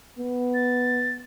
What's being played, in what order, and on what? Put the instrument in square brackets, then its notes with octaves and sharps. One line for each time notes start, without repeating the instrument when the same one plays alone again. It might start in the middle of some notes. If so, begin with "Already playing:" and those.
[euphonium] B3
[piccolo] A6